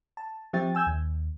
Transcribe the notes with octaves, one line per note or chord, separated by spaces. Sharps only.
A5
F3 C4 G4 E5 G5 A6
G#5 E6 G6 G#6
D#2